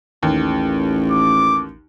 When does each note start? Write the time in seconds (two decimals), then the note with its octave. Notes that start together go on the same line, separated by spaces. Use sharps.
0.23 A1 D#2
1.11 D6